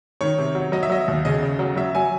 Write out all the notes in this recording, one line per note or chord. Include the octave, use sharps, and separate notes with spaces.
D#3 C#5
C3
F#3
F#3 D#5
E5
F#3 D#5
D#2
C#3 D#5
C#3
F#3
F#3 E5
F#3 G#5